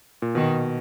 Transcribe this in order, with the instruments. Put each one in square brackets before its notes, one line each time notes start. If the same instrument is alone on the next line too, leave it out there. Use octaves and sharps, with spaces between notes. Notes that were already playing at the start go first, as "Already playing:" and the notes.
[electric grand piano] A#2
[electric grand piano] B2 [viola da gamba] D#3